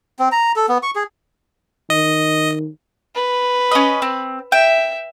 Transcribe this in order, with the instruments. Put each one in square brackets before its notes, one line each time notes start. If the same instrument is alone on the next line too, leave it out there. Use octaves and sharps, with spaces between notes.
[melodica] C4
A#5
A4
B3
C#6
G#4
[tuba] D#3 [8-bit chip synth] D#5
[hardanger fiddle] B4
[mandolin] C#4 D#5
C4
[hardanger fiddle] E5 [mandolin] G5